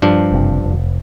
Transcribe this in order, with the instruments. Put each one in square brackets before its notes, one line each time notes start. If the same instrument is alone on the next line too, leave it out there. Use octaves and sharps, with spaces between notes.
[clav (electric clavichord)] G2 F3 D4
[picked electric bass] F#1 C3
F1